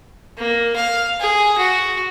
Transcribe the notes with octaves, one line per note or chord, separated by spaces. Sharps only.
A#3
F5
G#4
F#4